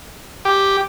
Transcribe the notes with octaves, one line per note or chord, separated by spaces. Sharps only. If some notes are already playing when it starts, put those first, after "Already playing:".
G4